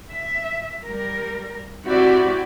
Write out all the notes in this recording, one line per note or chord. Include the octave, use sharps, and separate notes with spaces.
E5
G3 A#4
C4 E4 F#4 G4 D5